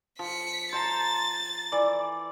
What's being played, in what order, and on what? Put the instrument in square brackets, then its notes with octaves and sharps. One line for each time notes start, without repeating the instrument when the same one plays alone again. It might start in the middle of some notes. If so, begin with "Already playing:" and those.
[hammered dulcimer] F3 [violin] B6 C#7
[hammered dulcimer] C5 A5 A#5 [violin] A6
[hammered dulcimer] E3 D5